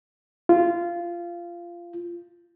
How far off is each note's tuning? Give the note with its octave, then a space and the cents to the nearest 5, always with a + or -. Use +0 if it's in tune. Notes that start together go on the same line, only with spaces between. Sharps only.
F4 -15